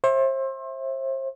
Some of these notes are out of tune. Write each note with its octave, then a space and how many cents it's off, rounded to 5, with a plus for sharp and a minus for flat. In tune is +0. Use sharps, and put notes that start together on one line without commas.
C5 +35 E5 +0